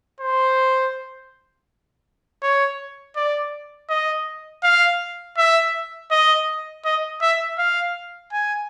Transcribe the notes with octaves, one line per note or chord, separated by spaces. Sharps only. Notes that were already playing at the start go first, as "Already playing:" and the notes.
C5
C#5
D5
D#5
F5
E5
D#5
D#5
E5
F5
G#5